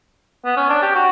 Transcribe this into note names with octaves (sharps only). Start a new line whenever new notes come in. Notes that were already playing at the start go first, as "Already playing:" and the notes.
B3
C#4
D4
G4
F#4